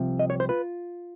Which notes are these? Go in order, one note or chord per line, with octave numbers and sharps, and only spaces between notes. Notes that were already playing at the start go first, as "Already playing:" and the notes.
Already playing: C2 C3 F3
D#5
C#5
C5
F4 B4